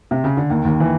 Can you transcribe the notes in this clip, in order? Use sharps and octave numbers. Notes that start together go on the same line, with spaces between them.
C3
C#3
D3
D#2 D#3
D#2 D#3
E3